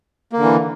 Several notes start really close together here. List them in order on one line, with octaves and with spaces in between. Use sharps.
A#3 D3 E3